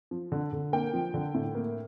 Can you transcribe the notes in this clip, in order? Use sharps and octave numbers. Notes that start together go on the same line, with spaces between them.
F3
D3
D3
A#3 G5
F3
D3
A2
A#3